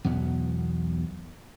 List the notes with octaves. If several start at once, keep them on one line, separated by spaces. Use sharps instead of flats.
B1 E2 B2 B3